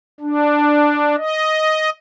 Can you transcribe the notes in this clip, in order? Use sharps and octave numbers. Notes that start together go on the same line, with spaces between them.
D4
D#5